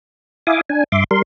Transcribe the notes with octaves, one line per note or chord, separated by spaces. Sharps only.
E4 E5 F5 G#5 D6 D#6
D4 G#5
G2 E5 C6 D6
G3 A#4 C6